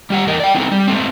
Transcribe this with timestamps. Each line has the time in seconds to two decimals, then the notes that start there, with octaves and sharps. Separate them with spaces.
0.10 G3 G4 F#5
0.27 E2 A#4 D#5
0.40 D5 G5
0.55 B3 C4 D#4 G#4 A4
0.71 G3
0.88 G#3 A3 C4